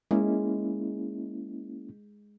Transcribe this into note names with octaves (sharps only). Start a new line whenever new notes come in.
G#3 A#3 C#4 E4